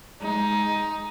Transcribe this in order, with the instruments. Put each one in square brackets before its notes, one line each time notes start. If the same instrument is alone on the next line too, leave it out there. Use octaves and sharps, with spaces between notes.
[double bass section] G#3 [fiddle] D#4